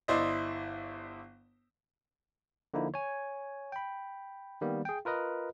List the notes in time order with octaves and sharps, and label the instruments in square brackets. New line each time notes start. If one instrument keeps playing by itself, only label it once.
[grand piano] G1 E4 C5 D5 D#5
[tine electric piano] D3 F3 A#3 D#4 E4
C#5 G#5
G5 B5
D#3 G3 A#3 B3
G#4 G5
F4 A#4 B4 D#5